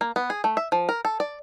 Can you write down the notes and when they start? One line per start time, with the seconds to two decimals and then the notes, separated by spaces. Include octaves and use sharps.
0.01 A#3
0.16 B3
0.30 G#4
0.44 A3
0.57 E5
0.72 F3
0.89 A#4
1.05 A4
1.20 D5